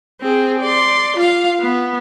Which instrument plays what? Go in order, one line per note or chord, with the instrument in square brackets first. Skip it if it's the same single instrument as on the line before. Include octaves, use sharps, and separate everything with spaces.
[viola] C4 G#4
D5 C6
F4 F5
B3